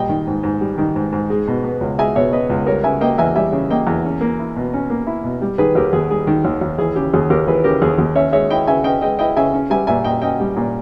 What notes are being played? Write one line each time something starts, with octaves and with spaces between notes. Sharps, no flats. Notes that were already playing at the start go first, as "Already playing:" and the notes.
Already playing: A#2 G3 D#5 G5
D#3
G#2
G#2
G3
D#3
G#2
G#2
G#3
B2
B3
C#2
G#3 E5 G#5
B2 C#5 E5
B3 B4 D#5
C#2
G3 A#4 C#5
C#3 E5 G#5
A#3 D#5 G5
E2 E5 G#5
G3 E5 G#5
C#3
A#3 D#5 G5
E2
C#4
A#3
E4
B2
C#4
A#3
E4
B2
G3
D#3 G#4 B4
D#2 G4 A#4
D#2 G#4
G3 G#4
D#3
D#2
D#2
E3 G#4
C#3 G4
D#2 G#4
D#2 G4 A#4
E3 G#4 B4
C#3 G4 A#4
D#2 G#4
D#2
C#4 C#5 E5
G#3 C#5 E5
E4 D#5 G5
C#3 E5 G#5
C#4 D#5 G5
G#3 D#5 G5
E4 D#5 G5
C#3 E5 G#5
C#4
G3 E5 G#5
A#2 E5 G#5
A#2 D#5 G5
C#4 D#5 G5
G3
A#2